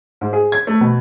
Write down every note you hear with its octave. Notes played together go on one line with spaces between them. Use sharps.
G#2
G#4
G#6
A3
B2